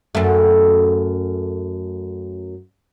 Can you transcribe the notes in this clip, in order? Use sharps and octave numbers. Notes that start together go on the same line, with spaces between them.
F#2 A3